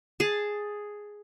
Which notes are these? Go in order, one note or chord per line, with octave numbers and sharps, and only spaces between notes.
G#4 A5